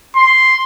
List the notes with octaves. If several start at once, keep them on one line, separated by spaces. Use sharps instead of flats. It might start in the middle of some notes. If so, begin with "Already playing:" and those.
C6